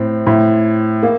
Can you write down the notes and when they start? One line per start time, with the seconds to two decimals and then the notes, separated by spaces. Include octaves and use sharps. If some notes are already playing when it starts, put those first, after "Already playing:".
Already playing: A2 C4
0.26 A2
1.03 A#3